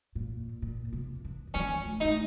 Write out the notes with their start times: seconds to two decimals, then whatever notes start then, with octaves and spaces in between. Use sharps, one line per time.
0.15 A#2
0.62 A#2
0.93 C3
1.25 E3
1.54 E3 C#4
1.85 A3
2.01 A3 D#4